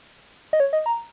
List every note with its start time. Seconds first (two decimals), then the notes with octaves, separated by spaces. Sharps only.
0.53 D#5
0.60 C#5
0.73 D#5
0.86 A#5